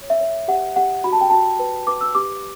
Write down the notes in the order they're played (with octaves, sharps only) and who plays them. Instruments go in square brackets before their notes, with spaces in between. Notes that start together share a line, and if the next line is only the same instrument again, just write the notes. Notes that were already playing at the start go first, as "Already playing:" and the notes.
Already playing: [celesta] C#5
E5
C#5
G4 F#5
G4 F#5
F#4 B5
A5
G5
F#4 A5
B4
B4 D6
E6
G4 D6